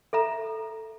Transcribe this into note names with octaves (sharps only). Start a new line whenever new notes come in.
A4 E5 A#5